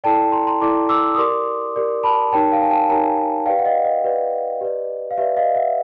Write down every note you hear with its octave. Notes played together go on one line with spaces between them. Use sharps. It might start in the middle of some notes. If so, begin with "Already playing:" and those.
E4 A4 D5 G5 A5
A#5 C6
A#5 C6
E4 A4 D5 C6 D6
D6 E6
D#6
G4 A#4 D5 C6 D6
G4 A#4 D5
A5 B5
D#4 G4 A#4 C#5 G5 A5
F5 G5
G#5
G5 A5
D#4 G4 A#4 C#5 G#5 A#5
G4 B4 D5 F5 G5
F#5
D#5 F5
D#5
G4 B4 D5
G4 B4 D5
F5
G4 B4 D5 E5
D#5 F5
E5 F#5